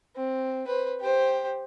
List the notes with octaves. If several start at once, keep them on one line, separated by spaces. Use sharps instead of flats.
C4
B4 C5
G4 C5